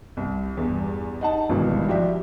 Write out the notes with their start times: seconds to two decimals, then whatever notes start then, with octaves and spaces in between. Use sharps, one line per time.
0.17 C2
0.57 E2 G2
1.21 D#4 F#5 A5
1.49 G#1 G2 B2 E3
1.88 F3 F#4 G4 D5 E5